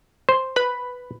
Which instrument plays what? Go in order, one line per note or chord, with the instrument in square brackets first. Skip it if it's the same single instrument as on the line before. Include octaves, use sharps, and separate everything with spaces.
[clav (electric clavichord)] C5
[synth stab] B4 B5